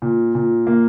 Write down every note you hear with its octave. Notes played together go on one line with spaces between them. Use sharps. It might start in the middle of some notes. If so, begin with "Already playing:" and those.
A#2
A#2
A#3